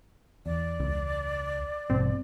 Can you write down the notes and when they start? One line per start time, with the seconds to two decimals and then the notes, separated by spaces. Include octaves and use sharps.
0.46 E2 D5
0.80 C#2
1.90 A1 G2 B2 C4